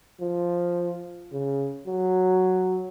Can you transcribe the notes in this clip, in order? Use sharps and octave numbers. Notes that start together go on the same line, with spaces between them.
F3
C#3
F#3